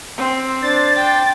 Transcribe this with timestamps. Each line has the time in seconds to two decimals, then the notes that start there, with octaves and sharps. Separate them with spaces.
0.17 C4
0.62 D4 C5 A6
0.96 G5